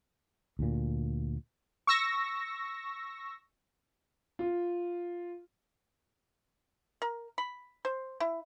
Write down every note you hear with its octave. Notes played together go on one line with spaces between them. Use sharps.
D2 A#2
C#6 E6 A#6
F4
A#4
B5
C5
E4